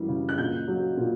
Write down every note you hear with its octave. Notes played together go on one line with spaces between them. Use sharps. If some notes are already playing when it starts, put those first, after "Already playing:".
Already playing: F#2 E3 G3
C#3
F#6
A#2 G6
F#3
A#2